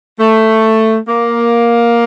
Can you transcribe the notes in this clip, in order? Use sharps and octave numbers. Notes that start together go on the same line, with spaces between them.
A3
A#3